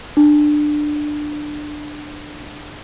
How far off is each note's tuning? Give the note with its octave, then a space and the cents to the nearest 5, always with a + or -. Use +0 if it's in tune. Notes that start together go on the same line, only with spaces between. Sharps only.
D4 +20